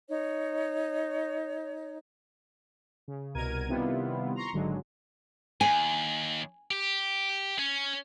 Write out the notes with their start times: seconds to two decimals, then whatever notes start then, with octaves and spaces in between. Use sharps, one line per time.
0.08 D#4 C#5
3.08 C#3
3.35 C2 B2 A#4 G#6 D#7
3.69 C3 D#3 G3 B3 E4 F4
4.36 A#5 C6 C#6
4.53 G#1 D3 F#3 G#3
5.61 D#2 G#5
6.71 G4
7.59 C#4